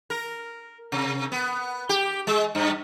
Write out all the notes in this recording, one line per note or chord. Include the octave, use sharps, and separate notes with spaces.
A#4
C3
B3
G4
G#3
G2